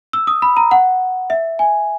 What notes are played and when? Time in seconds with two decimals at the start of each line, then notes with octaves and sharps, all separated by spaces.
0.13 E6
0.27 D#6
0.42 B5
0.57 A#5
0.71 F#5
1.30 E5
1.59 G#5